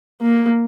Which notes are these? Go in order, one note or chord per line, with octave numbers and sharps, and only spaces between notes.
A#3